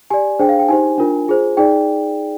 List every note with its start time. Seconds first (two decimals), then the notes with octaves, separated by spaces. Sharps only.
0.10 G4 D5 G#5
0.39 D4 G#4 C5 G5
0.49 F5
0.59 G5
0.69 D#4 G4 C5 G#5
0.98 D4 F4 A#4
1.28 F4 G#4 C5
1.57 D#4 G#4 D5 G5